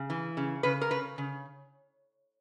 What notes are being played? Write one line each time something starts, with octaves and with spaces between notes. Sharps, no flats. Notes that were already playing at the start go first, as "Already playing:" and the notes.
Already playing: C#3
E3
C#3
C#3 B4
A#4
C#3 B4
C#3